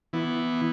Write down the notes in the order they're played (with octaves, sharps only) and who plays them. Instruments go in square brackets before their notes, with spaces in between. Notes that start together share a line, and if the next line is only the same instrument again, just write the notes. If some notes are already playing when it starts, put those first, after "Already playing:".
[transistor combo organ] E3 B3